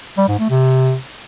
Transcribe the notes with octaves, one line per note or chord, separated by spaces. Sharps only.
G3
G#2
A3
C3